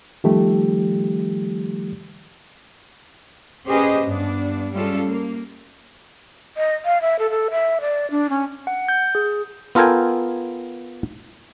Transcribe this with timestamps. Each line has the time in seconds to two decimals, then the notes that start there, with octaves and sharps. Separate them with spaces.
0.24 D#3 F3 G3 A3 G4
3.68 C#4 G4 G#4 B4 C5 D#5
4.06 G2 B3 D4
4.72 G3 G#3 C#4 F4 A4
5.04 A#3
6.57 D#5
6.85 F5
7.02 E5
7.19 A4
7.30 A4
7.51 E5
7.81 D5
8.11 D4
8.30 C#4
8.67 F#5
8.88 G6
9.15 G#4
9.75 B3 F4 A4 A#4 G5 G#5